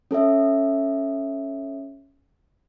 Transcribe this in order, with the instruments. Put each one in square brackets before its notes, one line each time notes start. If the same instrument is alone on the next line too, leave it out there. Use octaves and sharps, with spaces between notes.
[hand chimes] C#4 A4 C#5 E5